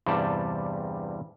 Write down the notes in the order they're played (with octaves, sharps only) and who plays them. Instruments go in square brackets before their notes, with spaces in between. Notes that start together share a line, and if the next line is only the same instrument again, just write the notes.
[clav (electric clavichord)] E2 G2 C3 G3 D5 A5